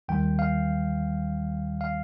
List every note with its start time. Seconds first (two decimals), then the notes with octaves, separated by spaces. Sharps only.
0.09 D#2 D#3 G3 G5
0.39 F5
1.81 F5